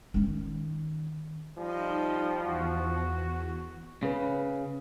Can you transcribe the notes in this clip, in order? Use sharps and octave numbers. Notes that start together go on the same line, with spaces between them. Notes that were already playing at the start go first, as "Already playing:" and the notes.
D#3 C#4
F3 G3 D#4 D#5
E2 F#4
C#3 C#4 B4